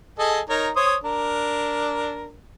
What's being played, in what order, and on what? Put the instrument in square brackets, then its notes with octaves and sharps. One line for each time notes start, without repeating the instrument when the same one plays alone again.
[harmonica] G#4 A4 D#5
D#4 A#4 C#5
C5 C#5 D#6
D4 A#4